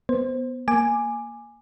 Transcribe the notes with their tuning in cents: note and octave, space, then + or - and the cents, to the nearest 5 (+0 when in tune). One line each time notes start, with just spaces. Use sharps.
B3 +0 C5 +0
A#3 +0 G#5 +0 D6 +15